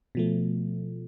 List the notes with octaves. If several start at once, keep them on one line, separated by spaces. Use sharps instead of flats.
B2 F3 A3